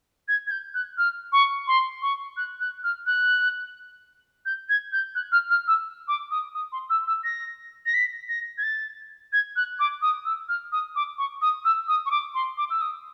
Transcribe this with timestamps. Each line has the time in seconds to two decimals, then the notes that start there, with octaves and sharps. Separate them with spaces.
0.28 G#6
0.47 G#6
0.51 G6
0.74 F#6
0.98 F6
1.32 C#6
1.67 C6
2.02 C#6
2.37 F#6
2.60 F#6
2.84 F6
3.06 F#6
4.45 G6
4.69 G#6
4.92 G6
5.15 F#6
5.32 F6
5.50 F6
5.67 E6
6.08 D6
6.31 D#6
6.54 D#6
6.72 C6
6.90 E6
7.07 E6
7.24 A#6
7.86 A#6
7.94 B6
8.29 A#6
8.58 G#6
8.63 A6
9.33 G#6
9.56 F#6
9.79 D6
10.02 D#6
10.25 E6
10.49 F6
10.72 D#6
10.95 D6
11.18 C#6
11.42 D#6
11.65 E6
11.88 D#6
12.06 C#6
12.11 D6
12.34 C6
12.57 D6
12.70 E6
12.81 D#6